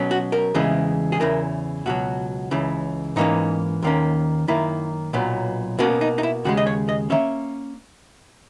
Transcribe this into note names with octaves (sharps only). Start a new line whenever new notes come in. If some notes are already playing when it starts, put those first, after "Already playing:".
Already playing: B2 F#3 C#4
F#4
A#4
E2 C#3 E3 G#3
G#4
E2 C#3 E3 A#4
C#2 B2 F#3 F#4
C#2 C#3 E3
G#2 E3 A#3 C#4 D#4
D#2 D#3 A#3 C#4
F#2 D#3 A#3 E4
B1 A#2 F#3 B3
B2 A#3 C#4 F#4
D#4
D#4
E4
D#2 C#3 G#3 F#4
D#5
C#5
D#5
D#3 A#3 C#4 E5